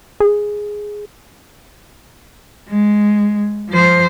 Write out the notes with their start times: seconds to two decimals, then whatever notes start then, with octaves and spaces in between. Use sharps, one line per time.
0.20 G#4
2.69 G#3
3.69 F3 C5